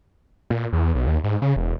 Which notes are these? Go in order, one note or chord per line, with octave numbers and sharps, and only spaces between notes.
A#2
E2
B1
D#2
G#2
C#3
E1